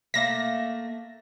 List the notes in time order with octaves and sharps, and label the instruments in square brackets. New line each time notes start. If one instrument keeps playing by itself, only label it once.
[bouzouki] A3 A#3 E5 [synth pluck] A#6